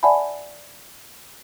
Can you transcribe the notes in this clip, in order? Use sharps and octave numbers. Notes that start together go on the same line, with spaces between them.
D5 E5 F#5 G#5 A5 B5